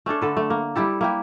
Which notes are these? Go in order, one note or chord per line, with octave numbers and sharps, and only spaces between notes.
A3 C#4 D4 A4
D3 A4 B4
A3
A#3
G3 E4 G4 A4
A#3 E4 G4